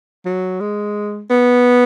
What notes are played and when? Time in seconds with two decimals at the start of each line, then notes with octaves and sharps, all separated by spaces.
0.25 F#3
0.60 G#3
1.30 B3